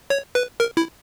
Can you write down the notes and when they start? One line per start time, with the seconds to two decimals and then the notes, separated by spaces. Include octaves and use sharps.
0.10 C#5
0.35 B4
0.60 A#4
0.77 E4